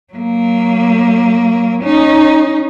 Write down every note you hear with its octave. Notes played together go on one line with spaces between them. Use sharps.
F#3 A#3
C#4 D#4